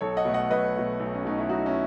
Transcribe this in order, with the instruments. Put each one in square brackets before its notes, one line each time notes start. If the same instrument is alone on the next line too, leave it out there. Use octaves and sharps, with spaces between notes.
[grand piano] B1 A4 C#5
D#5 F#5
B2 A3
D#5 F#5
B1 B4 D#5
B2 A3
B1
C#4
B2 A3 D#4
E4
B1 D#4 F#4
C#4 E4